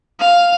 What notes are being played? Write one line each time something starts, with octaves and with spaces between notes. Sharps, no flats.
F5